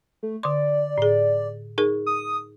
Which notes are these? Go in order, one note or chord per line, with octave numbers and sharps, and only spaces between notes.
A3
D3 D5 C6
A2 G#4
D#4 G#4 A#4
D#6